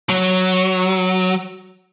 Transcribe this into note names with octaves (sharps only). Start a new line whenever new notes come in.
F#3